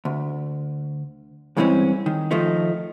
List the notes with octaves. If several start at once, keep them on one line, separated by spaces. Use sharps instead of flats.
D2
E2 G2 E3 G#3 C4 C#4
D#3
D#3 F3 A3 D#4